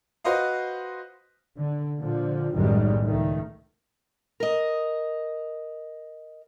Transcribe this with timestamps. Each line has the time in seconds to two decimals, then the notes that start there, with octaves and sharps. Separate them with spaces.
0.24 F#4 B4 C5 D#5 F5
1.56 D3
1.98 A#2 D3 F3
2.53 B1 F#2 A2 D#3 G3 G#3
3.04 C#2 D#3 A3
4.40 A#4 D#5